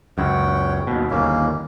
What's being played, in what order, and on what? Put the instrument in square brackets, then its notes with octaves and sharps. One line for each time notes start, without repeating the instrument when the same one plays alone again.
[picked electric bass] C#2 F#2 [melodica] C#5 F#5 G5
[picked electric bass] D#2 B2
[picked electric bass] G1 D#2 [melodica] A#3 C#4